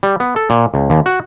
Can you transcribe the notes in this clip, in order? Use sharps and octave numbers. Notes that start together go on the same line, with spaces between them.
G3
B3
A4
A#2
C#2
D#2
F#4